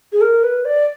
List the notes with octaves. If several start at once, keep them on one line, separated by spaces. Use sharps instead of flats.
G#4
A#4
B4
D5